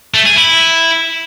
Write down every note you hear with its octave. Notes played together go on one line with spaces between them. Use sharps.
A3
G#4
E4